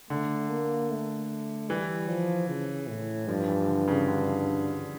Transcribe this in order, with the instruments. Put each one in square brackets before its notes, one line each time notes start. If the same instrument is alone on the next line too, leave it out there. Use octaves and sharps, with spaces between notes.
[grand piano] D3 [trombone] A3
[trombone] A#3
A3
[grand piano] E3 [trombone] G3
[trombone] F3
C#3
A2
[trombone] G2 [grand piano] F3
[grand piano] E3
D3
C#3
D3